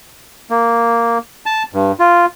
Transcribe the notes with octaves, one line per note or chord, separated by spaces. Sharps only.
A#3
A5
G2
F4